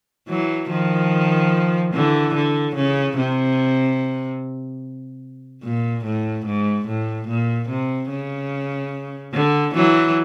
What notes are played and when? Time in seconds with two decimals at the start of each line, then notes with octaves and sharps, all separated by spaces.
0.29 E3 F#3
0.70 D#3 F3
1.93 D3 E3
2.34 D3
2.76 C#3
3.17 C3
5.64 A#2
6.05 A2
6.46 G#2
6.87 A2
7.28 A#2
7.69 C3
8.10 C#3
9.33 D3
9.74 E3 F#3